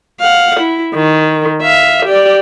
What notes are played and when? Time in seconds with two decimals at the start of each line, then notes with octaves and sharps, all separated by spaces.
0.20 F5 F#5
0.60 E4
0.95 D#3
1.62 E5 F5
2.06 G4 D5